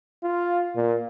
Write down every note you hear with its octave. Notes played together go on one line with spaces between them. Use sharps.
F4
A#2